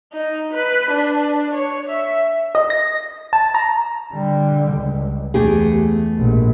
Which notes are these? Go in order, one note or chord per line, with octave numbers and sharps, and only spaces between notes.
D#4
B4
D4
C#5
E5
D#5
A#6
A5
A#5
D3 G3
C#2
E2 A3 G4 G#4
A#1 G#2